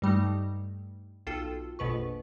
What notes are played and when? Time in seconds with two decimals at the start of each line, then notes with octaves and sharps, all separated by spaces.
0.02 G2 G3 A3 D#4
1.27 B1 F4 A4 G5 E6
1.79 A#1 F2 B2 B4 C#6